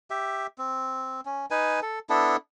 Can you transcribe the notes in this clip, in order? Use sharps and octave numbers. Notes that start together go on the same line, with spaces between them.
G4 E5
C4
C#4
D#4 B4 G#5
A4
B3 D4 E4 A4